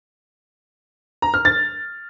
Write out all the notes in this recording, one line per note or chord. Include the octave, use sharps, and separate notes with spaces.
A#5
F6
A6